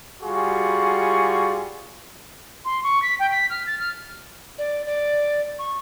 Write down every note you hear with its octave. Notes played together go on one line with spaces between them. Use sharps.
G3 F4 F#4 G#4 C#6
C6
C#6
B6
G5
B6
F6
A6
F6
D5
D5
C#6